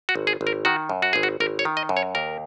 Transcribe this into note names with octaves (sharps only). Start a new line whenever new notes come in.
F#4
G#1
G#4
G#1
A#4
D#3 F#4
F#2
F#4
G#1 G#4
F#4
G#1 A#4
C#5
D#3
D#5
F#2
C#5
D#2 A#4